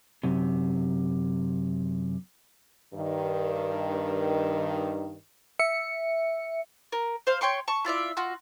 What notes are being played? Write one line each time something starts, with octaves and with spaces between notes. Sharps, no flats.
F#2 C3
G2 D#3
E5 C#7
A#4
C5 F5
C#5 G5 C6 C#6
A5 C#6
E4 F4 D5 E5
F4 F#4